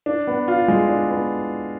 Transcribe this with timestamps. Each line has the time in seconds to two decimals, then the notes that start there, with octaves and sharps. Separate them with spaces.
0.06 D4
0.27 B3
0.48 F4
0.68 G#3
0.88 D4
1.10 B3